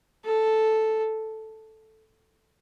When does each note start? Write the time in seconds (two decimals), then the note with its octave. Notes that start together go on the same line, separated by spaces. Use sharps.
0.25 A4